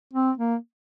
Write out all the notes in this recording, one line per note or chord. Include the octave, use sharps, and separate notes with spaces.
C4
A#3